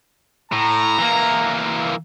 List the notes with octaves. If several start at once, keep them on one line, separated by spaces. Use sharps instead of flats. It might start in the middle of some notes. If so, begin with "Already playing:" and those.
A2 A#5
E3 A#3